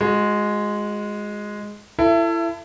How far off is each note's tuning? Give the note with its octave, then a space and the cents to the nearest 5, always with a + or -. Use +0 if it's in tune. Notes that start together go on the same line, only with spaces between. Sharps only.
G#3 +0 F#4 -35
E4 +25 A4 +25 E5 +30